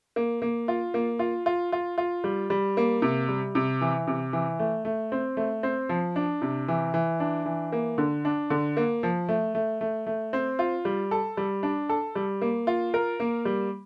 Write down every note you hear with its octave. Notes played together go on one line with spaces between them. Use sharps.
A#3
A#3
F4
A#3
F4
F4
F4
F4
G3
G3
A#3
C3
G3
C3
E3
C3
E3
A3
A3
C4
A3
C4
F3
D4
C3
E3
E3
D4
E3
A#3
D3
D4
D3
A#3
F3
A3
A3
A3
A3
C4
F4
G3
A4
G3
D4
A4
G3
A#3
F4
A#4
A#3
G3